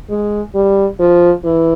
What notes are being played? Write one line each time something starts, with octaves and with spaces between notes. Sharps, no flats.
G#3
G3
F3
E3